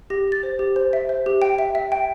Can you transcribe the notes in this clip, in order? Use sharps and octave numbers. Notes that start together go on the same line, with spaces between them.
G4 A#6
G4 A6
C5
G4
C5
E5
C5
G4
G5
E5
E5
G5